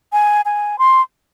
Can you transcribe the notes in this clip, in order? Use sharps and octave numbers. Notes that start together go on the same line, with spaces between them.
G#5
G#5
C6